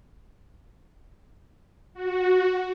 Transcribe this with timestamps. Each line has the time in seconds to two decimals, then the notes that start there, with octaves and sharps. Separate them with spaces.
1.94 F#4